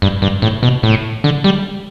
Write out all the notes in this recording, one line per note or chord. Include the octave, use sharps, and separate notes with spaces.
G2
G2
A2
B2
A2
D3
G3